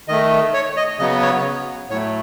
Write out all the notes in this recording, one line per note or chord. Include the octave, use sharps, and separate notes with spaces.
D#3 A3 D#5
C#5
D#5
C#3 F#3 B3 D#5
C#5
A2 F#3 A3 C#5